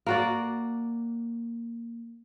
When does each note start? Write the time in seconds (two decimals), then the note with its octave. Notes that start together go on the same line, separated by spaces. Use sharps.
0.06 A#3 F#4 D5